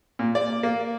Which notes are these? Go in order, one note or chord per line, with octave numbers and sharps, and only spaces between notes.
A#2
D5
A#3